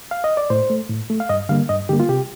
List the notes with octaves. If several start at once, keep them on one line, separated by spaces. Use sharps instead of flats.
F5
D#5
D5
A2 C5
A3
A2
A3
F5
G2 D#5
D3 G3 A#3 F5
G2 D#5
D3 G3 A#3 G4
F4
C3 G4